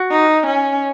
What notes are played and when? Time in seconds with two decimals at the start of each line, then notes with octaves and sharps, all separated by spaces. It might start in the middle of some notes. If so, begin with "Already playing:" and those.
Already playing: F#4
0.11 D#4
0.46 C#4